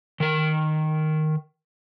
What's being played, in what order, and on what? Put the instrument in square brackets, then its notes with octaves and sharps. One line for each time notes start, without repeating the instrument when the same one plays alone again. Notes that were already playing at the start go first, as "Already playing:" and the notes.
[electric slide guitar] D#3 A#4